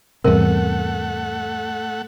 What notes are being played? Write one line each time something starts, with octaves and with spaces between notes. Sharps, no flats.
E2 G#2 C3 G3 A3 A#4 F#5